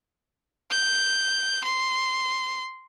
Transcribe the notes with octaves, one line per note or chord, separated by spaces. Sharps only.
G6
C6